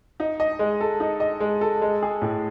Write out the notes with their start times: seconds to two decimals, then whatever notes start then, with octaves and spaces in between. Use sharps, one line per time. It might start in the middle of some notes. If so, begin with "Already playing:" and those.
0.20 D#4
0.40 D#5
0.59 G#3
0.81 A4
1.00 D#4
1.20 D#5
1.40 G#3
1.61 A4
1.82 G#3
2.03 G#4
2.22 A2